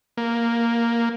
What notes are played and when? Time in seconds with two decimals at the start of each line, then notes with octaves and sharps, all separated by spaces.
0.17 A#3